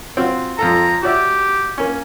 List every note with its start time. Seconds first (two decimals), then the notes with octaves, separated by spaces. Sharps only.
0.17 C4 F4 F#4
0.59 F2 F4 A4 A#5
1.03 F#4 G4 D5 E5
1.78 A#3 C#4